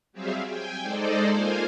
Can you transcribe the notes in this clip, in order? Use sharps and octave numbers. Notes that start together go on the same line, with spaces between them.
F#3 G3 C4 G#4 E5 F5
G5 G#5
G#3 D#4 A4 C5 D5
A#3 F4 C5 F5 G#5